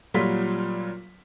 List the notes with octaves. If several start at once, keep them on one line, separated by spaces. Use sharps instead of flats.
A#2 F#3 G3 F4 C6 B6